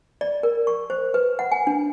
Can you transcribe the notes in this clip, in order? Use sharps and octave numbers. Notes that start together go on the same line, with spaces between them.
D5
A#4
C#6
C5
B4
F#5
G#5
D4